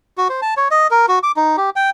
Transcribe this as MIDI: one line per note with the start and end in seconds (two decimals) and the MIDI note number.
0.18 0.28 66
0.29 0.41 72
0.42 0.54 81
0.57 0.68 73
0.71 0.87 75
0.91 1.06 70
1.08 1.19 66
1.23 1.32 86
1.37 1.56 63
1.57 1.70 67
1.76 1.90 79